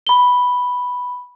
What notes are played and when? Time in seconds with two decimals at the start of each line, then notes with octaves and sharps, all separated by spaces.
0.07 B5 G7